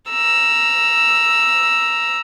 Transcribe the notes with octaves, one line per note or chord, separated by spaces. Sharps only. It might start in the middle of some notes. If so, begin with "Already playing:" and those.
A#5 E6